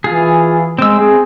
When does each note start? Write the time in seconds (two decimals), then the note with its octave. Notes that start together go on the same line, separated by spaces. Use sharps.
0.04 E3 F4 G#4
0.79 G#3 C4 E6
0.99 C4 G#4